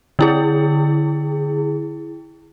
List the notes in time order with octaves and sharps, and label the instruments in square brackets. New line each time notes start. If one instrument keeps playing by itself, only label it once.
[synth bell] D3 E4 G#4